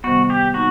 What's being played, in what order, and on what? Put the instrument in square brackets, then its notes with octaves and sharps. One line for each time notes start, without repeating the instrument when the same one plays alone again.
[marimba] C3 D#3 G3 B3 [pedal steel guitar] F#4
[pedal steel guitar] G4
[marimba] A#3 D#4 [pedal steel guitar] F#4